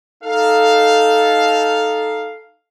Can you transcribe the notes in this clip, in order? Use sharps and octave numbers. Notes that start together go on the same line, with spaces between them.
D#4 A4 F5